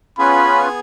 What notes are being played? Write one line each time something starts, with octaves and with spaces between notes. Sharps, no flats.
B3 C#4 F4 G#4 B4 G#5 B5